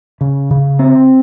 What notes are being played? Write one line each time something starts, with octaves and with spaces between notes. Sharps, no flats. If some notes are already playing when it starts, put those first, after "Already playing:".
C#3
C#3
C4